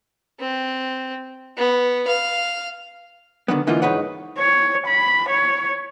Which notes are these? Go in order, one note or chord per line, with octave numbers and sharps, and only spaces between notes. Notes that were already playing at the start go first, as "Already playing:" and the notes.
C4
B3
F5
D3 D#3 F#3 B3
D3 E3 A#3 D#4 F4
C2 G#2 D#4 B4 C#5 F#5
C#5
B5
C#5